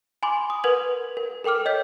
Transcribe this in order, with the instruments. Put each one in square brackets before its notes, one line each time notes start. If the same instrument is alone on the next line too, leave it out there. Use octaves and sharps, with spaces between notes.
[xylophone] G#5 B5 C6 D6
D#6
A#4 B4 F#5 G#6 F7 F#7
A#4
A4 A#4 G5 D6 F6
C#5 D#5 G6 B6